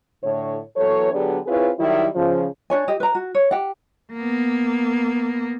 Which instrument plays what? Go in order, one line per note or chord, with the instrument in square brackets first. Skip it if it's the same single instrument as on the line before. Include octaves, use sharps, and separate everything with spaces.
[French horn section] A2 D3 C#5
E3 F#3 B3 A4 C#5
D3 F#3 B3 D4 G4 G#4
C4 E4 F4 G#4 B4 C#5
D#3 F#3 G3 E4
C#3 F3
[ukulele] D4 C#5 G#5
G4 D#5
B4 A#5
F#4
C#5
G4 F#5
[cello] A#3 B3